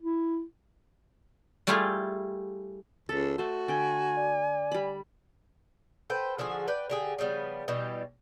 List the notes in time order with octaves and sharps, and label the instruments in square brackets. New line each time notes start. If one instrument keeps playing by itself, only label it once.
[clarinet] E4
[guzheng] G3 A3 E4 F4 G4 G#4
[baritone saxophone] C#2 [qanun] A4 E5 A#5
[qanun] A3 C5 [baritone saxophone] F#4
[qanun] D3 G5 B5 [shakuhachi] G#5
[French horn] D5
[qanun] G3 B5
[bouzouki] A4 B4 C5 G5
D3 F3 F#4 G#4
B4 D5 G5
D3 G4 G#4
C#3 F3 G3 B3
B2 E3 G3 G4